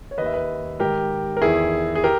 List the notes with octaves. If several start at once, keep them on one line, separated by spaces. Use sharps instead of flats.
C#5
D#2 D#3 B4 D#5
E5
B4 D#5
G#2 D#3 G4 A#4
A#4
E2 D#3 E4 G#4
G#4
G4 A#4